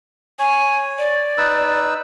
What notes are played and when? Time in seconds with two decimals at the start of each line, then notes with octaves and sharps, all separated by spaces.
0.39 C#5 G#5
0.98 D5
1.38 D#4 B4 E6